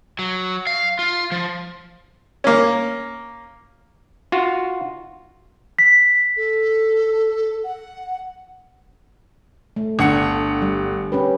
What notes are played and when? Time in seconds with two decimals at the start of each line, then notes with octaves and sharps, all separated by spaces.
0.19 F#3
0.67 F5
0.99 F4
1.32 F3
2.44 A#3 C#4
4.32 F4 F#4
5.79 B6
6.37 A4
7.64 F#5
9.76 A3
9.99 G1 D4 F#5 C#7
10.62 G3
11.12 C#4 G4 B4